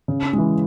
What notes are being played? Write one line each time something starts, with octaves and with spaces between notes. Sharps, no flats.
C#3
E3 G#3